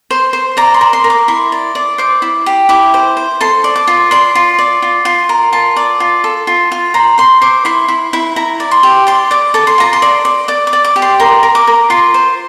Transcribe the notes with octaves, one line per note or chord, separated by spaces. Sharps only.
C5
C5
D5 A#5
C6
A#4
C6
A#4
D6
E4 C6
D5
D5
C5 D6
E4
G4
E4 D6
C5
C5
A4 C6
D5
D6
F4
D5 C6
F4
D5
F4
F4
A#4
F4 A5
D5
F4
A4
F4
F4
C5 A#5
C5 C6
C5 D6
E4 C6
E4
E4
E4 A#5
D5
C6
G4
D5 C6
D5 D6
A4 D6
C6
F4 A#5
C6
D5
D5
D5 D6
D6
D5
D6
G4
C6
A#4 C6
A#4
D6
A#4
F4 C6
C5